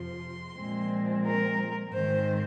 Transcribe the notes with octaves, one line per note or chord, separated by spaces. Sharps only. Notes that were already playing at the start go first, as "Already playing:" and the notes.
Already playing: F2 C3 F3 C6
A#2 F3 G#3 C4
A#4
G#2 D#3 C4 C5